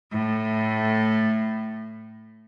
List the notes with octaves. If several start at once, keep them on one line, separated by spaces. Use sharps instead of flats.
A2 A3